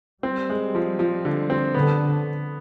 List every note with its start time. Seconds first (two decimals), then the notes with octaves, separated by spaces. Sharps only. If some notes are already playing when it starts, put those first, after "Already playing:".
0.23 G3 C4
0.50 G#3
0.75 F3
0.99 F3
1.25 D3
1.50 C4
1.74 D3 B3